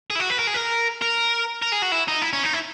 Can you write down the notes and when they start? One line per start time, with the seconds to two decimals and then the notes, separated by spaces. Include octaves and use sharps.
0.10 G#4
0.15 E4
0.20 F#4
0.30 B4
0.39 A#4
0.47 G#4
0.54 A#4
1.02 A#4
1.62 A#4
1.72 G#4
1.83 F#4
1.92 E4
2.08 D#4
2.22 E4
2.33 C#4
2.43 D#4
2.53 E4